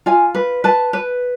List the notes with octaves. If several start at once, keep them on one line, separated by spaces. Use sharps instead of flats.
F4 G#5
B4
B4 A5
B4